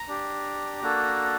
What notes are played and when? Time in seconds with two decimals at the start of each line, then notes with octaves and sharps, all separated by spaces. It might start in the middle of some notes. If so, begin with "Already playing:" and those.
Already playing: A#5
0.08 D4 G4
0.82 A#3 D4 F#4 A4